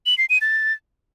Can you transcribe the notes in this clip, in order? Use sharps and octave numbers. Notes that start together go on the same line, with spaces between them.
F#7
C7
D#7
A6